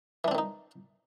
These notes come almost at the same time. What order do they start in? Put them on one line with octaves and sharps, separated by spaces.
E3 D4 C4 D#3 D#4